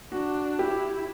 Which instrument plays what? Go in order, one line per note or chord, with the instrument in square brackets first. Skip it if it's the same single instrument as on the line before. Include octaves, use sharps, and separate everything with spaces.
[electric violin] D4 [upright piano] F#4
[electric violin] E4 [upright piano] G4